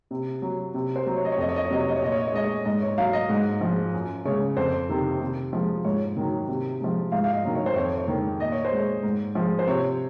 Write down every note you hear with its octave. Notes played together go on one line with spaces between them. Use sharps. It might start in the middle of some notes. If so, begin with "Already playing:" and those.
C3
F#3
C3
C5
F#3
C#5
D#5
C#5
F2 D#5
C#5
D#5
C#5
C3 F#3 D#5
C#5
D#5
C#5
A#2 D#5
C#5
D#5
C#5
G#3 D#5
C#5
G#2 D#5
C#5
F#3 F5
D#5
G#2
F3 G#3
F#2
C#3 G#3 C#5
F2 C5
C3 D#3
C3
F3 G#3
G#2 C#5
D#3 F#3
C3
F3 G#3
G#2 F5
F5
D#5
D#3 F#3
C#5
C5
F2 C#5
C#5
D#3 G#3
A#2 D#5
C#5
C5
G#3 C#5
G#2
F3 G#3
C5
C3 C#5